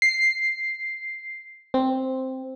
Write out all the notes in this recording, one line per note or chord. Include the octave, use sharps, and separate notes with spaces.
C7
C4